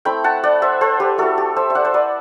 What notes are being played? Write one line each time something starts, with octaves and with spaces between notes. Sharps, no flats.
A3 C4 E4 G5 B5
F#5 A5
D5 F#5
C5 E5
A4 C5
G4 B4
A3 C4 E4 F#4 A4
G4
C5 E5
E5
D5 F#5
C5
B4 D5